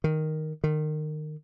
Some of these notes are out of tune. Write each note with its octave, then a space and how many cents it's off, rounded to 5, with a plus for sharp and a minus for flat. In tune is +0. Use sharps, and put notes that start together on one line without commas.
D#3 +0
D#3 -25